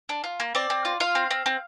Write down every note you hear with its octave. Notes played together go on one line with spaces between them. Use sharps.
D4
F4
A#3
C4 D5
C4
F4
F4 F5
C4
C4
C4